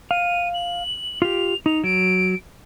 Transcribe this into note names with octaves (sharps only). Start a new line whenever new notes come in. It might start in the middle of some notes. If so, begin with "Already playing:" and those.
F5 D#7
F#7
F4 G4 F7
D#4 F7
F#3 D7